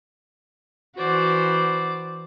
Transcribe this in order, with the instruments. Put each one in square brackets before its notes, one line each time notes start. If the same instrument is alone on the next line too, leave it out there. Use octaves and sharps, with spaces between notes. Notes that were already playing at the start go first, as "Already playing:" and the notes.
[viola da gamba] E3 F#4 [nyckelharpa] C5 D5